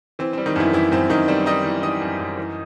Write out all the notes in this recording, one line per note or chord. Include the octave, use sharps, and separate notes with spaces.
E3 C4
G3 C4
D#3 D#4
F#2 E3 E4
F#2 E3 E4
F#2 C4
F#2 D#3 D#4
G3 C4 C5
G3 D#4 D#5
E3
E3 D#4 D#5
F#2
F#2
E3